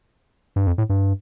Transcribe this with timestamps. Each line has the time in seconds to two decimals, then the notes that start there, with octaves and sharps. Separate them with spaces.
0.56 G2
0.67 F2
0.78 A2
0.90 G2